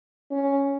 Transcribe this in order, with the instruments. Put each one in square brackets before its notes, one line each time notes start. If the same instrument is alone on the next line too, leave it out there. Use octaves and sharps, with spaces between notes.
[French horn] C#4